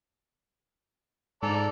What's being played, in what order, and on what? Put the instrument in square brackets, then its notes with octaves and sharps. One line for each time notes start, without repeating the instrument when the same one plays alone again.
[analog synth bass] G#2 [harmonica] A4 D5 A#5